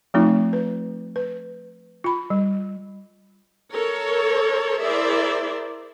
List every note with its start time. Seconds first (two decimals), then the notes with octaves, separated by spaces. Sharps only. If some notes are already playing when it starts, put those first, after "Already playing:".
0.14 F3 A3 C4 D#4 F4
0.53 B4
1.16 B4
2.04 F4 B5
2.30 G3
3.73 A4 A#4 C#5
4.82 E4 G#4 A#4 C5 D5 E5